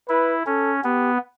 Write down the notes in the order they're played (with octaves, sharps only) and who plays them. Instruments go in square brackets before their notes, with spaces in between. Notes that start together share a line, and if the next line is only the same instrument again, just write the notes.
[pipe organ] E4 [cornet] B4
[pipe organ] C#4 [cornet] A4
[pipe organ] B3 [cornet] G4